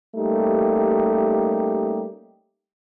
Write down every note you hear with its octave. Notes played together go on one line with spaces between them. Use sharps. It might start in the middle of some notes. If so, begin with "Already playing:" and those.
G3 A3 A#3 C#4 D#4 G4